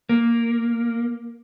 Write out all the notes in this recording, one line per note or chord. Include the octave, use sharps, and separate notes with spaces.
A#3